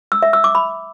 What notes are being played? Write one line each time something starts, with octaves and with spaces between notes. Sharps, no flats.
E6
E5
E6
D6
B5